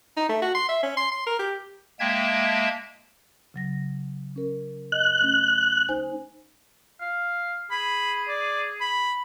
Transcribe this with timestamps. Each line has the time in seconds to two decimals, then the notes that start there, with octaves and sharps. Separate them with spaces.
0.17 D#4
0.29 A3
0.42 F#4
0.55 C6
0.69 E5
0.83 C#4
0.97 C6
1.11 C6
1.26 A#4
1.39 G4
2.00 G#3 A#3 E5 G5 A5 G#6
3.54 C#3 F#3 A#6
4.36 C#4 A#4
4.92 D#5 F#6
5.21 A3 C#4
5.89 D#4 C5 G#5
7.01 F5
7.71 G#4 B5
8.28 D5
8.81 B5